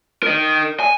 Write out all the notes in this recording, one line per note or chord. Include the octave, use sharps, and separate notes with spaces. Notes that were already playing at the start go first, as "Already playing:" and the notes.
A#4 D#5
G#5